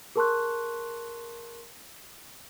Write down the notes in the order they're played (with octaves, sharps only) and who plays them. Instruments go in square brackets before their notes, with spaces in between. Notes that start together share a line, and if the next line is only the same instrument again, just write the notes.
[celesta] G#4 A#4 A5 C6 C#6 F#6